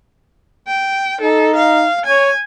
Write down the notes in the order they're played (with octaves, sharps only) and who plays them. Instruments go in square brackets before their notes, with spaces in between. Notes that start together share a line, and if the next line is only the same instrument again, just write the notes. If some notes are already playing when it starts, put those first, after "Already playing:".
[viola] G5
[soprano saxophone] D#4 [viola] A4
[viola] F5
[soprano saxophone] C#5 [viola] G#5